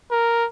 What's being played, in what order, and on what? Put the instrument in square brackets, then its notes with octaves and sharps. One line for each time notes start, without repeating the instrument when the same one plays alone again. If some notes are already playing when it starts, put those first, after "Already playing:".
[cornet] A#4